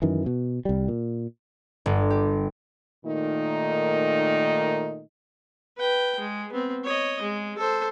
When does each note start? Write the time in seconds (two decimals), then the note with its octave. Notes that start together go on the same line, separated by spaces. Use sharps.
0.02 F#2 D#3 E3
0.26 B2
0.65 C2 G3
0.88 A#2
1.86 G1
2.10 G4
3.06 A#2 D#3 A3 D#4
5.78 B4 G5
6.19 G#3
6.52 B3 C4
6.84 C#5 D#5
7.22 G#3
7.58 A4 C5